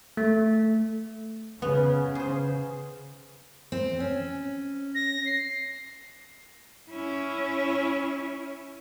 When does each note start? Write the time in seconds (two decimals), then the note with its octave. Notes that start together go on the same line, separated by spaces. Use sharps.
0.17 A3
1.62 C#3 B3
2.15 G#4 C5
3.72 C4
4.00 C#4
4.95 A#6
5.26 C7
6.90 C#4 E4